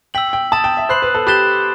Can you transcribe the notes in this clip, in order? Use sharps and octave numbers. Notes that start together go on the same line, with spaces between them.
G5 E6 B6 F#7
G5
A5 D#6 A6 E7
G5
E5
C5 B5 F#6 C7 F#7
B4
A4
G4 B5 F#6 A6 E7 G7